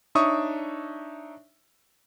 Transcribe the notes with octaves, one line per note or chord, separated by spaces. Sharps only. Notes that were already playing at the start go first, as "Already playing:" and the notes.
D4 D#4 C#5 E5 C#6 D#6